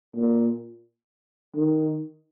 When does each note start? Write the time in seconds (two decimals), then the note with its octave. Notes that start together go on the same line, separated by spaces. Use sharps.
0.16 A#2
1.56 D#3